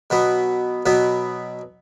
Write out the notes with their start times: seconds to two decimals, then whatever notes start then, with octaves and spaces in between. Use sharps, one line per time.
0.10 B2 F#3 B3
0.86 B2 F#3 B3